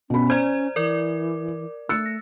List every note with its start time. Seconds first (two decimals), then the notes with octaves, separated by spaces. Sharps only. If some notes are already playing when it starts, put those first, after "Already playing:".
0.10 B2 C#4 B5
0.30 C5 D5 A#5 G#6
0.76 E3 A#4 D5 D6
1.89 A3 E6 F#6 A6 C#7
2.06 A#6